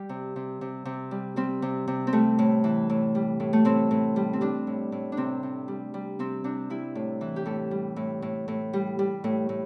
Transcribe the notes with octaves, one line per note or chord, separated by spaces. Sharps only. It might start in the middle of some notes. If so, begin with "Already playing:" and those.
Already playing: G3 G4
C3
C3
C3
C3
G3
G3 C4
C3
C3
C4
G3 A3
A2
E3
A2
G3
A2
A3
A2 C4
A2
G3
C4
G3 D4
A2
A2
D4
C3 C4
C3
G3
G3
C3 C4
C3 D4
G3 E4
A2
E3
G4
A2 A4
G3
A2
A2
A2
G3
G3
A2
A2